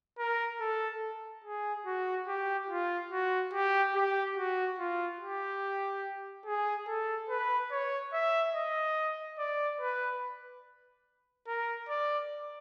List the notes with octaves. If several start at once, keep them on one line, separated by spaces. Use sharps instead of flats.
A#4
A4
G#4
F#4
G4
F4
F#4
G4
G4
F#4
F4
G4
G#4
A4
B4
C#5
E5
D#5
D5
B4
A#4
D5